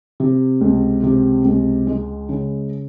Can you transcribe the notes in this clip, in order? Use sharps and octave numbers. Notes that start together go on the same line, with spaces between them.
C3
C#2
C3
C#2
G#3
C#3